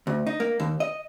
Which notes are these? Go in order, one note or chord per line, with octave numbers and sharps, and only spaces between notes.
D2
D#4
A#3
D#2
D#5